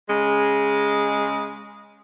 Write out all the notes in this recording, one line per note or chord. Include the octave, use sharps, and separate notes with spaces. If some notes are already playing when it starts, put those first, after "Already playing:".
C#3 G#3